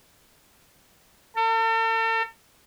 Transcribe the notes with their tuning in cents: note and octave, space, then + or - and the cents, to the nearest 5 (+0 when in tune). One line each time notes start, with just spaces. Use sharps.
A4 +45